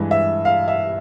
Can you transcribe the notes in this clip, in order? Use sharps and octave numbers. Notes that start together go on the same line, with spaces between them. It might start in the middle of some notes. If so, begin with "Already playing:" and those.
Already playing: G2 E3 G#3
E5
F5
E5